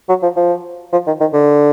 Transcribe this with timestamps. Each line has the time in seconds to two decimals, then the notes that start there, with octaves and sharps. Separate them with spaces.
0.09 F#3
0.23 F3
0.36 F3
0.92 F3
1.07 D#3
1.20 D#3
1.33 D3